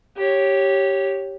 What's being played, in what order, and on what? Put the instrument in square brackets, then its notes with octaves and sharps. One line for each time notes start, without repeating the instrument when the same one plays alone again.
[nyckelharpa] G4 C#5